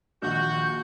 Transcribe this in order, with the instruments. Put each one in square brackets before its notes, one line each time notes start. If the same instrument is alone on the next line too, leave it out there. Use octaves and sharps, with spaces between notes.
[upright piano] A#1 [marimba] D#3 D4 [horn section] F#4 [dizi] G6